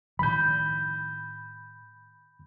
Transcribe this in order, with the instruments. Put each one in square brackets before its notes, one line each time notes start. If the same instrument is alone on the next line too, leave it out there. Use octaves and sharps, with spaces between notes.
[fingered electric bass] A2 D#3 F3 [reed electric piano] B5 G6